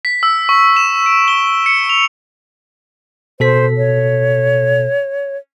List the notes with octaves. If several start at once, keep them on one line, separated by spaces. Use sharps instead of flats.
B6
E6
C#6
E7
D7
G7
C#7
F7
B2 A4 C5 B6
C#5